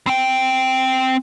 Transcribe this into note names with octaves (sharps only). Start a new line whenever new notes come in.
C4 G5